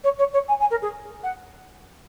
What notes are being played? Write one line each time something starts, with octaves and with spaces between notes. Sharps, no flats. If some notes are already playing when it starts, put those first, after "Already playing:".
C#5
C#5
C#5
G#5
G#5
A#4
G#4
F#5